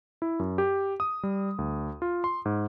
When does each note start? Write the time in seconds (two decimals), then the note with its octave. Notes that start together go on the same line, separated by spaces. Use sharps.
0.22 E4
0.39 F#2
0.58 G4
1.00 D#6
1.23 G3
1.58 D2
2.02 F4
2.24 C6
2.45 G#2